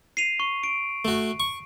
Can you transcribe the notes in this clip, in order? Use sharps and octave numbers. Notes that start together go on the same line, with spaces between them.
C7 D#7 F7
C#6
D7
A3 F#4
C#6